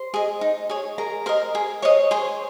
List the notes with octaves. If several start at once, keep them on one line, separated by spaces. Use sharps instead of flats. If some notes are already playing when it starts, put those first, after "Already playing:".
Already playing: C5 C6
G#4 D#5
D#4
G#4 C#5
G#4 A#4 A#5
A#4 C5 D#5 A#5
G#4
C5 C#5 D#5 C#6
G#4 C5 C6